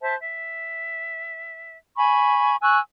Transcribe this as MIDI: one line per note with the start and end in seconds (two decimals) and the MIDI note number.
0.01 0.15 72
0.01 0.15 76
0.01 0.15 81
0.20 1.77 76
1.97 2.56 80
1.97 2.56 83
1.97 2.56 85
2.62 2.79 80
2.62 2.79 85
2.62 2.79 88
2.62 2.79 90